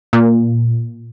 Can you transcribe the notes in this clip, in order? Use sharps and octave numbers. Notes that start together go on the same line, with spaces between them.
A#2